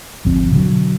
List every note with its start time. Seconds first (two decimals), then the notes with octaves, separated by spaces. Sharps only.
0.25 G#1 D2 F3 C4
0.51 B2 D3 F#3